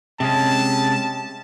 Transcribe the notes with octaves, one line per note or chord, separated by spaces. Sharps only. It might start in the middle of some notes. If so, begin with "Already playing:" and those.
C3 G#3 C#4 A5